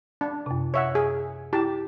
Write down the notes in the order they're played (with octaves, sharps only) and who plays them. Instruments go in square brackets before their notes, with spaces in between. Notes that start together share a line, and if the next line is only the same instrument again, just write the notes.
[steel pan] D4 [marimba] A5
[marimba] F#2 C3
[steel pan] C#5 E5 F#5
G#4
[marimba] E4 [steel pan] G4 A5